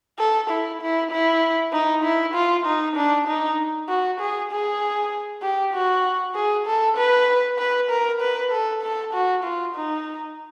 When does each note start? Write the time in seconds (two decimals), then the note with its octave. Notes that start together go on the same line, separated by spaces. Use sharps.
0.19 A4
0.50 E4
0.82 E4
1.12 E4
1.73 D#4
2.04 E4
2.35 F4
2.66 D#4
2.96 D4
3.28 D#4
3.89 F#4
4.21 G#4
4.52 G#4
5.43 G4
5.74 F#4
6.35 G#4
6.67 A4
6.97 B4
7.59 B4
7.90 A#4
8.21 B4
8.52 A4
8.83 A4
9.14 F#4
9.44 F4
9.75 D#4